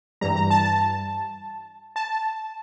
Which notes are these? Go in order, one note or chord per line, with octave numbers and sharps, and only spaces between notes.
G2 E3 G3 A#5
A#5
A5
A5
A5